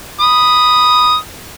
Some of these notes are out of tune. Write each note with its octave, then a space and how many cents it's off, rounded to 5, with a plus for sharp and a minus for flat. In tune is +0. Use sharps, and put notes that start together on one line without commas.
B5 +0 D#6 +0